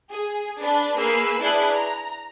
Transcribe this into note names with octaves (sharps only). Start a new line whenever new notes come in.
G#4
D4 B4
A#3 G#4 B4 E6 C7
D4 E4 G#4 B4 F#6
A#5